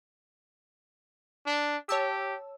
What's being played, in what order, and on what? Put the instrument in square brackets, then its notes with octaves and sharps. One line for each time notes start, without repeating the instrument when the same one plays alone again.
[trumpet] D4
[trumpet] G4 [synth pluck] C#5 A5 E6